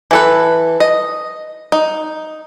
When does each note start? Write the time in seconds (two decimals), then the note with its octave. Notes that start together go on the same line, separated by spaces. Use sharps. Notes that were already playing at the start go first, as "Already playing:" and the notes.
0.11 E3 A4 B4
0.80 D#5
1.72 D#4